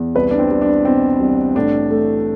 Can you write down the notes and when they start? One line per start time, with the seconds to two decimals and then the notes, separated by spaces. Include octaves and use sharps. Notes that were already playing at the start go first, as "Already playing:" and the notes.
Already playing: E2
0.15 C2 B4
0.31 D4
0.39 C4
0.51 G3
0.62 D4
0.85 B2 C4
1.20 C2
1.55 A2 D4
1.91 A3